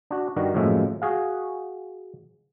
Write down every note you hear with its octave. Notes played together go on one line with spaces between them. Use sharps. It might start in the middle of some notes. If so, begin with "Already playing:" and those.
D4 F#4
G2 D#3 G3 F#4 A#4
F#2 A2 F3 G#3 A#3 E5
F#4 G#4 F5